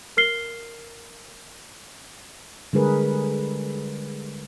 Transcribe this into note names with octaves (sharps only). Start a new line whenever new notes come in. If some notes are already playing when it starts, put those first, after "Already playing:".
A#4 F6 C7 G7
D3 G3 G#3 G#4 A#4 B4